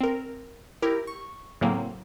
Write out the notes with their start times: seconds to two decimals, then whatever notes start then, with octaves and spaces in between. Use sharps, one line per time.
0.01 C4 A#4
0.82 E4 G4 A#4
1.07 C#6
1.61 A2 C#3 F#3 A#3 C4